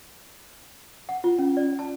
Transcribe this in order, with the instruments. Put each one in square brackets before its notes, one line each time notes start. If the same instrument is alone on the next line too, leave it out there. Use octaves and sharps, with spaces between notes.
[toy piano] F#5
F4
C#4
D5
A5